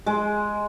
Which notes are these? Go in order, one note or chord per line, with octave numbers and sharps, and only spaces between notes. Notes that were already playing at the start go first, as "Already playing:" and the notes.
G#3